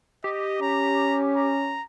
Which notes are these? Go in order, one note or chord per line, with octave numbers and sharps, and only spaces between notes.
G4 D#5
C#4 A#5
A#5